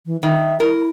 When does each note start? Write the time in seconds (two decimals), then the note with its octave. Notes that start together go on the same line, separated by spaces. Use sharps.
0.06 E3
0.23 D#3 E5
0.60 E4 A#4